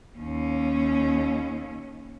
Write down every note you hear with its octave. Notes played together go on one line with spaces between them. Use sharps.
D#2 C#4